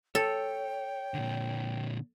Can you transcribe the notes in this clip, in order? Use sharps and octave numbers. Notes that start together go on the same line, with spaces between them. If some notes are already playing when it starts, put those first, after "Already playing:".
A4 C#5 G5
A#2 D3